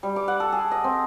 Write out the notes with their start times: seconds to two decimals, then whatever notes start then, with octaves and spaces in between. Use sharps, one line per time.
0.03 G3
0.16 D6
0.28 F#5
0.40 A4
0.52 G#4
0.72 D#5
0.84 C4